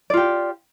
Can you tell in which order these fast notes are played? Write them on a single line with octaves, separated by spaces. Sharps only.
D5 F4 G4